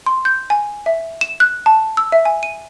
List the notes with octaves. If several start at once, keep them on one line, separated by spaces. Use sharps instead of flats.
C6
G6
G#5
E5
E7
F#6
A5
E6
E5
G#5
D#7